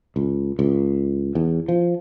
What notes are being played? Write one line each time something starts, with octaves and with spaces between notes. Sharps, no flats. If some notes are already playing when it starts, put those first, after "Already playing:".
C#2
C#2
E2
F3